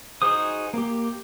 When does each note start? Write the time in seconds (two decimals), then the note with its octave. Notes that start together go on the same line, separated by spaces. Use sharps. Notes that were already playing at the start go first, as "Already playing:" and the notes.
0.22 D#4 F#4 G#4 C5 D#6
0.74 A#3 G4